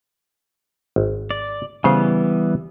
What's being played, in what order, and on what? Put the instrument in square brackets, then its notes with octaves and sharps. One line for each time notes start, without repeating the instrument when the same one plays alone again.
[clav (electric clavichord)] G#1
[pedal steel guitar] D5
[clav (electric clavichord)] C#3 C5 F5 [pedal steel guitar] E3 G3 B3